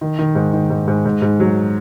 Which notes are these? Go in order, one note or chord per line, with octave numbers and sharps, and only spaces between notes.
D#3
D#3
G#2
D#3
G#2
G#2
G#2
G#2
F#3